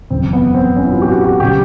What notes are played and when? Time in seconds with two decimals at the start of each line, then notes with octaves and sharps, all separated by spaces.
0.10 F#1 E2 C#3 C4
0.33 B3
0.54 C4
0.76 C#4
0.84 E4
0.92 F4
1.02 G4
1.08 F#4
1.25 F#4
1.40 C#3 F#3 G4